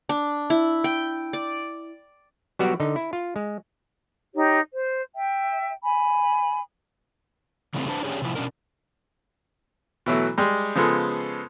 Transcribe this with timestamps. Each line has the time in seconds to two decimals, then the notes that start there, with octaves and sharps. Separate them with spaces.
0.09 D4
0.50 E4
0.84 G5
1.33 D5
2.59 F#3 G3 B3 F#4 G4 D5
2.80 D3 D#4
2.96 E4
3.13 F4
3.36 G#3
4.35 D#4 G4 C#5
4.74 C5
5.15 E5 G5
5.83 G#5 B5
7.74 C#3 E3 G3 A3 A#3 C4
7.88 D4 B4 C5 A5
8.03 C#4 D4 G4 G#4 C#5
8.22 C3 F3 E4
8.35 B2 C#4 D4 A#4
10.06 B2 E3 F#3 A3
10.38 G3 G#3
10.75 C#3 F3 G#3 B3 A4